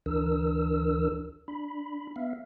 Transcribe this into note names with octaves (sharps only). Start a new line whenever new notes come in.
D2 E3 D4 A#4 E6
D4 B5
B3 E5 F5